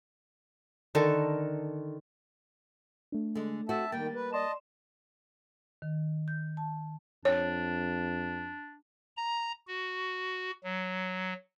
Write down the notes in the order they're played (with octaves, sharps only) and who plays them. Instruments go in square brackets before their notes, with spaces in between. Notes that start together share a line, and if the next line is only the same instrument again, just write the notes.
[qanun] D3 D#3 A4 A#4
[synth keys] A3 D4
[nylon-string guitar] D3 G#3
[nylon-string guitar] A3 C4 F#4 [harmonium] E5 A5
[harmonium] D#3 G5 [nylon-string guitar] G3 A#3 [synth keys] A6
[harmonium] B4
[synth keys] D5 C6 E7 [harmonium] D#5 A5
[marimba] D#3
G6
A5
[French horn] F2 [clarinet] D4 [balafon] C#5
[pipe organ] A#5
F#4
F#3